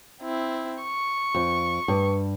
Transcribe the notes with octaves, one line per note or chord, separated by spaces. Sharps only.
C4 E4
C#6
F2
G2